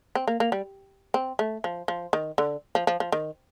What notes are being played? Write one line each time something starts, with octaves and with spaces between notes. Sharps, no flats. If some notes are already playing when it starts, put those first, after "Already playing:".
C4
A#3
A#3
G3
C4
A3
F3
F3
D#3
D3
F3
F3
F3
D#3